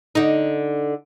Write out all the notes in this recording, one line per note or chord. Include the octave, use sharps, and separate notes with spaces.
D3 D#4